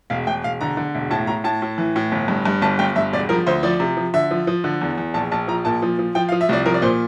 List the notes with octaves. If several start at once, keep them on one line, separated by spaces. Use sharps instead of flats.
E1 F5
E1 G5
E1 F5
D3 A#5
D3
E1
A2 A5
A2 A#5
A2 A5
A2
E3
A2
G1
G2
G2
G1 A5
G1 G5
G2 E5
E1 D5
F3 A#4
D2 C5
F3 D5
C3
F3
D3 E5
F3
F3
D3
E2
E2
A#1 A5
A#1 A5
F3 A#5
A#2 A5
F3
F3
F3 G5
F5
F3
E5
C2 D5
F3 A#4
D5
A#2 C5